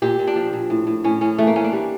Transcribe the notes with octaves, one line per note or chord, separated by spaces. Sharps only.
A#2 G4
A#2
D4
F3
A#2
A2
A2
A2 C#4
A2 C#4
E3 A3
A#3
E3 C#4
D4
G3